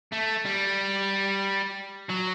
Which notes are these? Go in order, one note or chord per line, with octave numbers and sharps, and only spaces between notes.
A3
G3
F#3